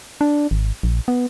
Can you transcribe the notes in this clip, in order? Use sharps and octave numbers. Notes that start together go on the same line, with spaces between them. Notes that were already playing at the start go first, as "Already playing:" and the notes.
D4
G#1
A#1
B3